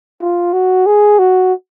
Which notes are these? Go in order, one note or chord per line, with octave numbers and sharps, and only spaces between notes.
F4
F#4
G#4
F#4